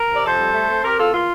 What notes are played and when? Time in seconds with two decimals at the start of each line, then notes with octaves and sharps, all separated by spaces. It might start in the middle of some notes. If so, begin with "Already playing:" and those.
Already playing: A#4
0.09 C3
0.15 D5
0.24 F2 A4 C5
0.38 G3
0.53 A3
0.69 C4
0.83 C4 G4 A#4
0.98 E2 F4 A4
1.13 A#3 F4